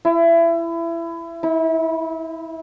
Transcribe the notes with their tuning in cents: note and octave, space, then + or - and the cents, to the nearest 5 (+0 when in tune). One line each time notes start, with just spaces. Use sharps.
E4 +25
E4 -30